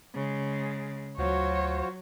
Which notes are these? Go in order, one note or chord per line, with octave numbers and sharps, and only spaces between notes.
C#3 G#3
D2 F#3 F4 F#4 C5 C#5